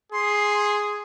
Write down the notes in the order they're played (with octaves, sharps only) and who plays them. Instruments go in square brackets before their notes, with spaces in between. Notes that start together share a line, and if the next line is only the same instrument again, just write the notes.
[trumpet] G#4 [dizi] C6